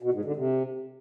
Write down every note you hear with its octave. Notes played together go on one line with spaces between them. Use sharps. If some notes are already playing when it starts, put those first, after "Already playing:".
B2
G#2
D3
C3